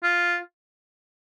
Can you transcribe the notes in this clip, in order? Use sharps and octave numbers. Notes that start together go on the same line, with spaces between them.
F4